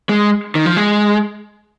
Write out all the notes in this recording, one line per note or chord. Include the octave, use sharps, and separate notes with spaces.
G#3
D#3
F3
G#3